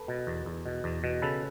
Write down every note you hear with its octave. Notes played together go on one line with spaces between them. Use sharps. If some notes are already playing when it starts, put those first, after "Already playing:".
Already playing: A4 B4
B2
E2
E2
B2
E2
B2
C#3 A4 B4